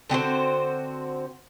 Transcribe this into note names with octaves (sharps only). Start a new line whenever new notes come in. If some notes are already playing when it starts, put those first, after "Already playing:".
D3 C4 F#4 C5